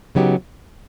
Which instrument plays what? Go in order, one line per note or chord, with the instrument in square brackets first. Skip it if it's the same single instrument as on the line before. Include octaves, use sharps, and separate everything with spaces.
[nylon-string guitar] C#3 F#3 B3 D#4 G4